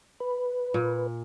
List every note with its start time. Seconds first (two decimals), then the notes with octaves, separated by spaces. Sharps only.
0.20 B4
0.74 A#2